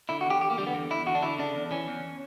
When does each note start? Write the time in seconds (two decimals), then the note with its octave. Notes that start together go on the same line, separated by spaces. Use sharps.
0.09 D3 E4
0.21 F#4
0.26 E2 G4
0.41 E2 G4
0.50 A#3
0.58 D3 G3
0.67 B3
0.74 E2
0.90 E2 E4
1.06 D3 F#4
1.15 D4
1.23 D3 E4
1.38 C#3 D4
1.55 E2
1.71 E3 C#4
1.88 E2